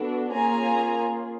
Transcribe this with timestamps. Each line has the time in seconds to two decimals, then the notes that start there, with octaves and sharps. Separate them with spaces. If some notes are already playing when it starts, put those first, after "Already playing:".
Already playing: B3 D4 F#4 A4
0.32 A#3 C#4 F4 G#4 G#5 A#5